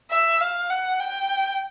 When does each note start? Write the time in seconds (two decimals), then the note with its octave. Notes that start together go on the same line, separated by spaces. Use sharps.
0.11 E5
0.41 F5
0.70 F#5
1.00 G5